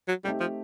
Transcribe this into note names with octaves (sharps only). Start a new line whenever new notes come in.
F#3
G3 A3 C4 D#4 G4
F3